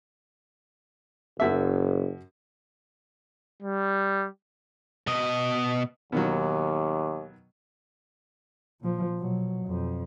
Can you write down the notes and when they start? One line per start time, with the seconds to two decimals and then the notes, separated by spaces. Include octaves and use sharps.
1.40 F#1 F#2 E5
3.62 G3
5.07 B2 D#5
6.12 D#2 B2 D#3 F#3
8.81 A#2 F3
9.18 B2 F#3
9.65 F2 B2